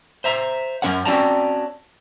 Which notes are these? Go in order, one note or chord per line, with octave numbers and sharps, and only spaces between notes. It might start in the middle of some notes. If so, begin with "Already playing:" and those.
C5 E5 A#5
F#2 G#3 C#4 A#4 C#5 F#5
C4 C#4 F#4 D5 A5 A#5